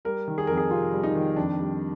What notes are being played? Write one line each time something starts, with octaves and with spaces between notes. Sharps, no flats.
G3 A#4
D#3
G#4
F2 A#4
G#4
C3 F4
G3
D#4
D#3
F2 D4
G3